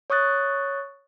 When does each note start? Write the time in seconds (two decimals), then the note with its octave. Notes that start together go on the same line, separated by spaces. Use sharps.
0.10 C#5 C#6 D#6 F#6 A6